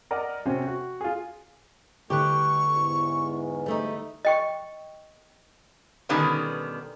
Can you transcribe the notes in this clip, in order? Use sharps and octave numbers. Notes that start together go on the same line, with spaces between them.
A#4 D5 D#5 F#5
C3 C#4 F#4 C5
F#4
F4 G#4
D2 D3 G3 A3 G4 B4 C#6 F#6
E2 G#2
G3 A3 D#4
D#5 G5 C#6
B2 D3 D#3 G3 B3 C#4